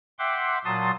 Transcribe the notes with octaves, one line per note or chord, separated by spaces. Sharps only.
E5 F#5 G5 C6 D6
A#2 F#3 A5 C6 D#6